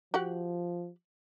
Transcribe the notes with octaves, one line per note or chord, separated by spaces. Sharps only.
F3 F#4 G4 F#5